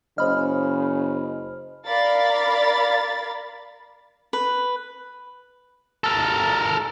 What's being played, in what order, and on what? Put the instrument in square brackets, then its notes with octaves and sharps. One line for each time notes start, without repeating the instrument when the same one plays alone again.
[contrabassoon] F#1 [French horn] C#3 [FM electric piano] C5 D#5 [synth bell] B5 F6
[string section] A#4 D5 F5 B5 A6
[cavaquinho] B4
[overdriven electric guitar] A4 A#4